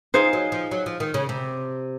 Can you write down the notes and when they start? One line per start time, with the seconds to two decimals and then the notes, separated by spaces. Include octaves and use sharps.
0.14 F3 D#4 G#4 C5 F5
0.33 F#3
0.52 F3
0.71 F#3
0.86 F3
1.00 D#3
1.14 C#3
1.29 C3